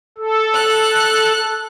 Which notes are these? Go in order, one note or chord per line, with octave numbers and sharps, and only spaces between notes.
A4
F#6